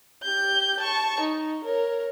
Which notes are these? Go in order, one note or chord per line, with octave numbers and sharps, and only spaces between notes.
G4 G6
A5 C#6
D#4
A#4 C#5